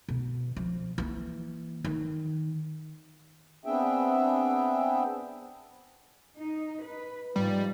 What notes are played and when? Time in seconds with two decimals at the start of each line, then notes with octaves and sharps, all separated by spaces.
0.09 B2
0.57 F3
0.98 E3 A#3
1.85 D#3
3.65 B3 C4 D4 G#4 E5 G5
6.39 D#4
6.83 B4
7.36 G#2 F3 G3